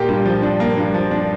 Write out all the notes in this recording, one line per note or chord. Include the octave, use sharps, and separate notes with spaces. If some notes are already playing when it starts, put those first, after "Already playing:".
Already playing: A#2 A#3 G4 G5
G2
F3
D4
A#3
G2
F3
D4